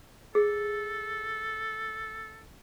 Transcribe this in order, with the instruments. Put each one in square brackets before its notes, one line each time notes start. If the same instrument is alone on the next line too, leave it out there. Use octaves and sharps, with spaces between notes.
[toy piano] G#4 [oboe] A4